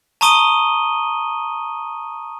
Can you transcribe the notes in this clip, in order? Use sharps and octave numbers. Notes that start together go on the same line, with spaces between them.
A5 A#5 C#6 D#6 D#7 G7